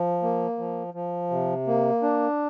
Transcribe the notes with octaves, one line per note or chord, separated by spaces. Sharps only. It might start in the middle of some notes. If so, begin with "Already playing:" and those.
Already playing: F3
A#3
F3
F3
C3
A#3
D4